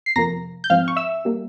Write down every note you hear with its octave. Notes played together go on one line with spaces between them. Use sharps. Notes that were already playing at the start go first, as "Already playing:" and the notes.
C7
F2 C3 F3 A#3 A#5 A#6
G6
G#2 F3 C4 F5 F6
C#6
E5 E6
G3 A#3